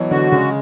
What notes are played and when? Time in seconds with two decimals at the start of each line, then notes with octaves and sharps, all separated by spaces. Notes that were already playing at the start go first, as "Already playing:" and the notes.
Already playing: B2 E3 F#3
0.11 D3 F#4
0.32 C#3 G#3